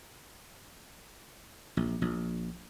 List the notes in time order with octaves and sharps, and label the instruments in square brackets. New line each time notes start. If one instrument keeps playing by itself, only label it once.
[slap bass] A#1
A#1